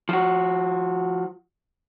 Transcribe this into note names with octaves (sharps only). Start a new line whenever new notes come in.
F3 F#4